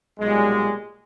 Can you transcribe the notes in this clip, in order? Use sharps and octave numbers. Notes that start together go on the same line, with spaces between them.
B1 A#2 G3 G#3